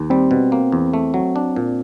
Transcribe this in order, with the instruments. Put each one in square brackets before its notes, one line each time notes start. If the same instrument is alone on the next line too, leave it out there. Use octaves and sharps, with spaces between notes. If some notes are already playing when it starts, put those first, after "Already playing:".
Already playing: [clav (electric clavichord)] D#2
[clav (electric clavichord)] G3 [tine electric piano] C4
[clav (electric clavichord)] B2
A#3
E2
A3
F#3
D4
A#2